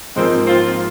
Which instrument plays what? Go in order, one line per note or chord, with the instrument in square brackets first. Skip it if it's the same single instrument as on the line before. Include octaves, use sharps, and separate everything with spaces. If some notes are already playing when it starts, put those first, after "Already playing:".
[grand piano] G#2 F3 A#3 [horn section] G#3 C4
[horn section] C4 F4